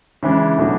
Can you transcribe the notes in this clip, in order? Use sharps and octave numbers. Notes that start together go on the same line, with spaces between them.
C#3 E3 G#3 D4
B2 F#3 A3 D4